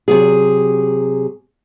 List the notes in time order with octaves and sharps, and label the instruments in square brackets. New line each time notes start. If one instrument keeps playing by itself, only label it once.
[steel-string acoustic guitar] C3 F#3 G#4